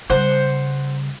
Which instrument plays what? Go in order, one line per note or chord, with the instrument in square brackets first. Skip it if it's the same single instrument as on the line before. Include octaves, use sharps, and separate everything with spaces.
[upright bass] C#3 G3 [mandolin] C5 F#5